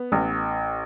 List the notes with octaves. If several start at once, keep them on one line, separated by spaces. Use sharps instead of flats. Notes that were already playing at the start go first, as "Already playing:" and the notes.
Already playing: B3
A1